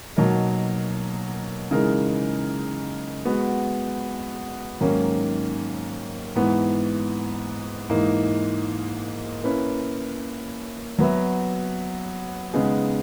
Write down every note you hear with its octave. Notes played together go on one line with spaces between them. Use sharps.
B2 F#3 A#3 D#4 A#4
C#3 E3 G#3 D#4 A#4
G#3 B3 F#4
G#2 D#3 F#3 A#3 C#4
G#2 E3 B3
G#2 E3 A#3 D#4
A#3 C#4 E4 B4
F#3 B3 F#4 B4 E5
C#3 G#3 B3 D#4 G#4